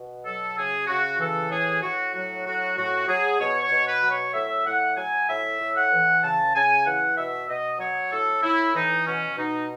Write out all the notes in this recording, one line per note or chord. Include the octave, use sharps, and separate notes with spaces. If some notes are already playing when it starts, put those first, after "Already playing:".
Already playing: B2
F#3 A4
C#3 G#4
C#3 F#4
E3 A4
A2 G#4
A2 F#4
F#3 F#4
A2 F#4
A2 F#4
F#3 G#4
B2 C#5
C#5
B2
B4
F#3
C#5
A2 E5
A2 F#5
F#3 G#5
A2 E5
A2
F#5
E3
C#3 A5
C#3 G#5
E3 F#5
B2 E5
B2 D#5
F#3 C#5
A2 A4
A2 E4
E3 D#4
B2 C#4
B2 D#4